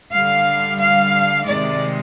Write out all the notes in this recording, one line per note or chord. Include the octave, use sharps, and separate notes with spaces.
D3 G3 F5
F5
C3 D#3 G#3 D5